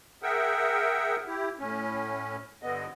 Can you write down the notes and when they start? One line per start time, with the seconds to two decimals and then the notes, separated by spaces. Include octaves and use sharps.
0.23 G#4 A#4 E5 F#5 G5
1.27 E4 G4
1.59 A2 C#4
2.63 G2 D3 B3 D#5